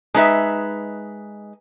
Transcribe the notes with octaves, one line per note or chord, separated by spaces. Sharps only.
G#3 D#4 B4 E5